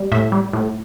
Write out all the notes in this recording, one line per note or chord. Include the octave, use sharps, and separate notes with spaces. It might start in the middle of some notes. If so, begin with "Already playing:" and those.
Already playing: G3
A2 E5
G3
A2